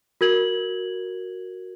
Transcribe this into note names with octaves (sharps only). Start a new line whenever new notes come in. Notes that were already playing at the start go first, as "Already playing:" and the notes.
F#4 A#4 G#6 F#7